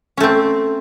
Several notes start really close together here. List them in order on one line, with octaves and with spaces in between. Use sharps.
C#4 A3 C4